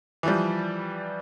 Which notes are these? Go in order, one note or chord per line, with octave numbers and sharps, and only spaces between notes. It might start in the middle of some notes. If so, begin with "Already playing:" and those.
E3 F3 G3